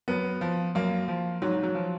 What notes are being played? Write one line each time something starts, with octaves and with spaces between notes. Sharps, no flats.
F#2 B3
F3
F#2 A#3
F3
G#2 F#3
F#3
F3